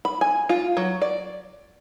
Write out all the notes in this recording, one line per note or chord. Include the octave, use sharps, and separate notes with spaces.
B5
G#5
F4
F#3
D5